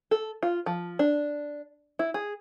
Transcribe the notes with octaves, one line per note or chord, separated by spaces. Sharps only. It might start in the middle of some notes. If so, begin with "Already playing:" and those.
A4
F4
F3
D4
E4
G#4